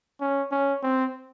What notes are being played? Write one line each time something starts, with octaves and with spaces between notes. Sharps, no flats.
C#4
C#4
C4